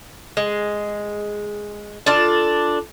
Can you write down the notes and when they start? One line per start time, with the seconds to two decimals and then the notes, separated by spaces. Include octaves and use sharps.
0.37 G#3
2.06 D4 F4 A4 D5